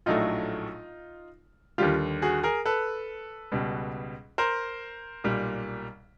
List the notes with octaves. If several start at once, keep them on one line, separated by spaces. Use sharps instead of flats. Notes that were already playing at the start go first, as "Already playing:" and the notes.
A#1 A2 F#3 A3 D#4 F4
D#2 D3 G3 F4 G4
F#4 G#4
G#4 A#4
A4 B4
C#2 B2 G3
A#4 C5
B1 A#2 G3